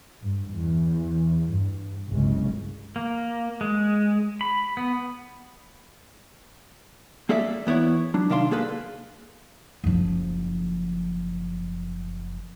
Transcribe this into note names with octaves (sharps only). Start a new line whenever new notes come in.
G2
E2
G2
G1 C2 F#2 C#3 G#3
A#3
G#3
B5
B3
A#3 G#4 A4 D5 E5
E2 B3 E4 C#5
F#3 D4
C2 D#3 D4 F5 C6
A#3 G#4 A4 B4 F5
F#1 F3